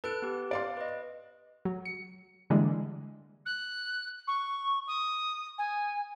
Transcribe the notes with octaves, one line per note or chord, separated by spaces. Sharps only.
A4 B4 F#6 D7
B3 G4
D5 F5 C6
B4 D#5
F#3
C#7
D3 E3 G3 G#3 A#3
F#6
C#6
D#6
G#5